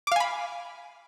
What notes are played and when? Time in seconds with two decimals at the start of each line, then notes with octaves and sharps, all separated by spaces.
0.07 D6
0.12 F5
0.16 G#5
0.20 B5